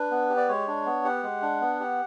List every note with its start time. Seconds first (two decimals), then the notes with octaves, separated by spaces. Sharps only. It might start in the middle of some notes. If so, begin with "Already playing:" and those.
Already playing: D4 B4
0.11 B3
0.30 G4
0.37 D5
0.48 G#3 C#5
0.67 D4
0.86 B3
1.04 G4 F#5
1.23 G#3
1.42 D4
1.61 B3
1.80 G4